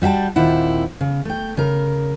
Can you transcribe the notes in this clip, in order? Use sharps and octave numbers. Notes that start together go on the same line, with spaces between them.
G3 F#4 E5 G5 A5
D#2 A#2 C4 E4 F#5
C#3
A3 G5
C#3 A#4